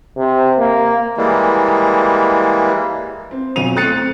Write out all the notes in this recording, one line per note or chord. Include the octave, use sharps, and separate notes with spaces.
C3
A#3
E3 G3 G#3 A#3
C4
B1 F2 F#3 D#7 F7
A3 C4 F#6 A6 C#7 D#7